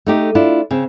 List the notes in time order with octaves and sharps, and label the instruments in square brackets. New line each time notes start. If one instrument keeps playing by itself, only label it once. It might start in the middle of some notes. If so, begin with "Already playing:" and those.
[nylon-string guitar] A3 D#4 G4
D4 E4 F4
C#3 C4